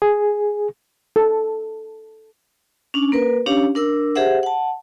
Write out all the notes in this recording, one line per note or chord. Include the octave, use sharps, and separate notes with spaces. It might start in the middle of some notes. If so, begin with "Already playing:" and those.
G#4
A4
C#4 D4
A#3 A#4 B4
C#4 D4 G4 C#5 F5
D4 A#4 E6
G4 G#4 C5 E5 F#5
F#5 A5